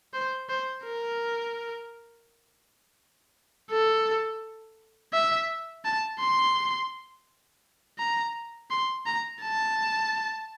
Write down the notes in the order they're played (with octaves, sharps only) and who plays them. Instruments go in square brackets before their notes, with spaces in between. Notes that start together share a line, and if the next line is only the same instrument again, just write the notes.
[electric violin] C5
C5
A#4
A4
E5
A5
C6
A#5
C6
A#5
A5